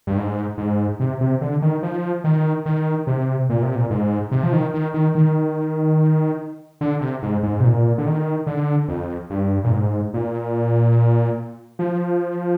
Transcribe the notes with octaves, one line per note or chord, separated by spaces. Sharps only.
G2
G#2
G#2
C3
C3
D3
D#3
F3
D#3
D#3
C3
A#2
C3
A#2
G#2
C3
F3
D#3
D#3
D#3
D#3
D3
C3
G#2
G#2
C3
A#2
D3
D#3
D3
F2
G2
A#2
G#2
A#2
F3